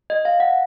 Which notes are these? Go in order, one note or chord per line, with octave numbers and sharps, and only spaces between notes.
D#5
F5
F#5